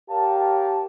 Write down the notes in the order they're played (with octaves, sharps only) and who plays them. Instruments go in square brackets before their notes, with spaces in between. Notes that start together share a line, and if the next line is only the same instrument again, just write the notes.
[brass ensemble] G4 A#4 C#5 F5 G5 A5